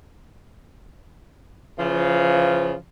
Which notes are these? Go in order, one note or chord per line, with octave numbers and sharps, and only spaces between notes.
C#3 E3 F3